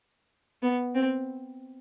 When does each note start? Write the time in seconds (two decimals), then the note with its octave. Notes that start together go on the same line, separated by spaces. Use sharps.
0.62 B3
0.95 C4